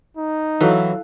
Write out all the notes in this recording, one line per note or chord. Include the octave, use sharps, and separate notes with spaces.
D#4
E3 F#3 A4 F5